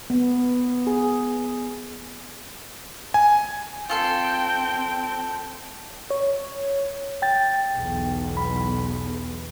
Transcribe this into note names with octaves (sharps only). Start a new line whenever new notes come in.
B3
G#4
G#5
C4 F4 A4 G5 C6
C#5
G5 A6
B1 E2
B5